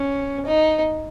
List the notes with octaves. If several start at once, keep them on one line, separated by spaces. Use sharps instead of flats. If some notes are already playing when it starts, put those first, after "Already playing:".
Already playing: C#4
D#4